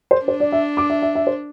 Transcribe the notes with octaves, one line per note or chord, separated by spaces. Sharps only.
C5
D4 C5
D5
E5
D6
E5
E5
E5
C5